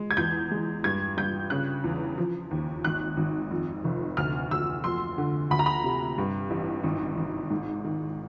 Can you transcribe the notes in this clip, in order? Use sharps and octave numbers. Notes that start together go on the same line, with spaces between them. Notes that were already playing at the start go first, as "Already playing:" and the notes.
Already playing: G#3
G#6
E2 G6
G#3
G2 G#6
G2 G6
C#3 F#6
E2
F3
D#2
G#1 F#6
G#1
F2
F1
D2 F6
D2 E6
F2 C6
D3
D2 B5
A#5
B5
C3
G2
A1
G#1
G#1
G#2
D#3